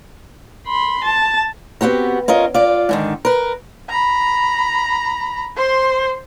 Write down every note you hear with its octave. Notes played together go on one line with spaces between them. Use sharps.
B5 C6
A5
B3 C4 F#4 G4 A#4
C#4 F4 A#4 D#5
F4 D5
G#2 D3 D#3
A#4 B4
A#5 B5
C5 C6